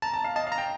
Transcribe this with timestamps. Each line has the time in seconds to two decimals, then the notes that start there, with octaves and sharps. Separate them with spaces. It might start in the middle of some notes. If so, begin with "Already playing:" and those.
0.02 A5 A#5
0.13 A5
0.24 F5
0.35 D#5 A5
0.47 F5
0.52 A#5
0.58 G5